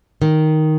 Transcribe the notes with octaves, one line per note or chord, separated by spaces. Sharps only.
D#3